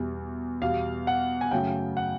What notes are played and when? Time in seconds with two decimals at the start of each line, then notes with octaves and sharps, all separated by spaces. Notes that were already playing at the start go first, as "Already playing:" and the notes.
Already playing: E2 B2 G3
0.62 E2 B2 G3 F5
1.07 F#5
1.41 G#5
1.51 F#2 C#3 F#3 A3 G5
1.97 F#5